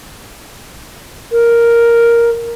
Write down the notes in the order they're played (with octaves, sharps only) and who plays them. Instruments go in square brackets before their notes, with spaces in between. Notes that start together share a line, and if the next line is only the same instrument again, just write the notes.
[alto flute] A#4